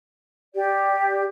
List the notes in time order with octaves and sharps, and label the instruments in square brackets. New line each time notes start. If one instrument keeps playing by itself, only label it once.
[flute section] G4 D5